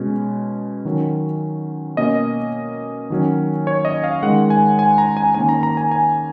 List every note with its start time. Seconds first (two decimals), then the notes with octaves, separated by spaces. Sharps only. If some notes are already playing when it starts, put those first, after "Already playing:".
Already playing: B2 G#3 C#4
0.85 D#3 F#3 C#4
1.97 B2 A#3 C#4 D#5
3.10 D#3 F#3 C#4
3.67 C#5
3.85 D#5
4.04 F5
4.23 D#3 G#3 C#4 F#5
4.50 G#5
4.79 G#5
4.98 A#5
5.17 G#5
5.35 D#3 A#3 C#4 G#5
5.49 A#5
5.63 A#5
5.77 G#5
5.92 G#5